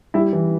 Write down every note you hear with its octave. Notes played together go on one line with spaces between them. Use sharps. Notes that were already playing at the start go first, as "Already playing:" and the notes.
G3 E4
E3